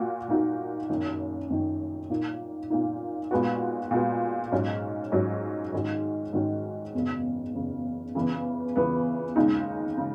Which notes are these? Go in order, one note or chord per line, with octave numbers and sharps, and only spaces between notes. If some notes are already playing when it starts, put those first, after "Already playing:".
Already playing: A#2 A#3 F#4
A#2 A#3 D#4 F#4
F#1 F#2 D#3
F#1 F#2 D#3
A#2 A#3 D#4
A#2 A#3 D#4
A#2 G#3 B3 F#4
A#2 G#3 B3 F#4
G#2 F#3 C#4
G#2 F#3 C#4
G#2 D#3 G#3 C#4 F#4
G#2 D#3 G#3 C#4 F#4
F#1 E2 C#3
F#1 E2 C#3
E2 C#3 E3 B3
E2 C#3 E3 B3
D#2 C#3 G#3 D#4
C#3 G#3